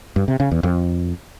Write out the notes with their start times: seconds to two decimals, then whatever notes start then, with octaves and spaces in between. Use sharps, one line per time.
0.16 G2
0.28 C3
0.40 C#3
0.52 E2
0.63 F2